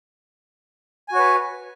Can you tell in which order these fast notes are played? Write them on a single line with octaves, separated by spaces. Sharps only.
G#5 F#4 C#5 B4